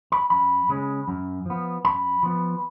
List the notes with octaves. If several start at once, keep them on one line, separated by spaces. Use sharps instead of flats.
B5
F#2 B5
C#3 G#3 C#4
F#2
F3 B3
F#2 B5
F3 B3